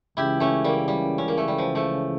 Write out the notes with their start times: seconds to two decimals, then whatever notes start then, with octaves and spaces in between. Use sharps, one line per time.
0.17 C#2 C#3 E3 E4 G4
0.40 A3 C#4
0.64 G3 A#3
0.88 G3
1.18 C#4
1.28 A#3
1.37 A3
1.48 G3
1.58 F3
1.75 F3 A3